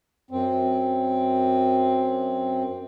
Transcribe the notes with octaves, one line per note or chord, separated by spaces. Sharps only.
F#2 C4